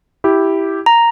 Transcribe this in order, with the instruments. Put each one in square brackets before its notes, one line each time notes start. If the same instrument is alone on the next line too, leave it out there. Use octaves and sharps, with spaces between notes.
[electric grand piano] E4 G4
[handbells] A#5